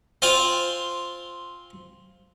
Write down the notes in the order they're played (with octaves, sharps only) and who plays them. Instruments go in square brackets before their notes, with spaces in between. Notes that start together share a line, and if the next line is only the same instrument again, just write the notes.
[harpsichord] C4 F4 C5 F5 G#5